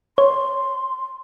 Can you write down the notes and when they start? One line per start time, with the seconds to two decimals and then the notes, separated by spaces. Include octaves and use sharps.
0.18 C#5 C6